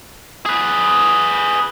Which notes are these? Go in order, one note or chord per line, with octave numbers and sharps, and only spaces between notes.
G#4 B4